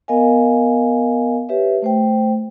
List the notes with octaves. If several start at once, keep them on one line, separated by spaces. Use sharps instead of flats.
B3 A#4 D#5 F5 G#5
G4 B4 C#5 E5
A3 C5 G5